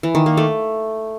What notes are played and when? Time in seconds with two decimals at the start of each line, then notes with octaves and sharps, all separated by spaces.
0.03 E3
0.15 D#3
0.26 A#3
0.37 A3